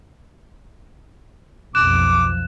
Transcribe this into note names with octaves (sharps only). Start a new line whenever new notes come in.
B1 F2 F3 D6 F#6 E7